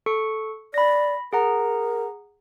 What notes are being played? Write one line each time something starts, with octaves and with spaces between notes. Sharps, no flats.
A4 C#6 C#7
D5 B5 A#6
G#4 A#4 F#5 A#5